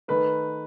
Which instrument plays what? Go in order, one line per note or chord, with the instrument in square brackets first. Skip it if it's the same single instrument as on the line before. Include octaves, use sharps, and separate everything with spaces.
[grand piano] D#3 A3 [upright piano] B4